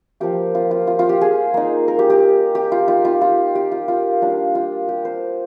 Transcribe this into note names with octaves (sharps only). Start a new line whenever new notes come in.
F3 A#3 F4 G4
F4
F4
F4
F4
G4
G#4
A#3 D#4
A#4
G4
G4
G4
F4
A#3 D#4 F4
F4
F4
G4
F4
F4
G3 A#3 D4 F4
F4
G4
C5